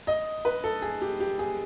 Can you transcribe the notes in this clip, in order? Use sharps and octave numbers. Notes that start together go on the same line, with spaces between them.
D#5
B4
A4
G#4
G4
G4
G#4